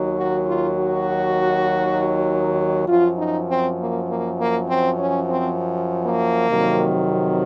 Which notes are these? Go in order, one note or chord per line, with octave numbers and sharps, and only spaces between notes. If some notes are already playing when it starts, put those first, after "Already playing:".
Already playing: D#2 D#3 F#3
F#4
F4
F#4
F#2 F3 F4
D#4
C4
A#3
A#3
A#3
C4
C#4
C4
A#3
F2 C3 D#3 F#3